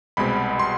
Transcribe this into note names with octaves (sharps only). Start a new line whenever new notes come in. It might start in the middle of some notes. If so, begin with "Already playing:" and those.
C2 B2 G#3 C4 B5
C6